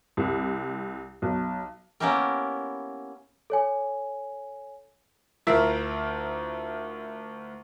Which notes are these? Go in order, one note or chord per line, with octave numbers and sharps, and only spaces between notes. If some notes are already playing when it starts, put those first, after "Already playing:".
C2
B1
A#3 B3 C#4 E4 G4 A#4
A4 C#5 G#5
D2 E4 F4 A#4 E6 B6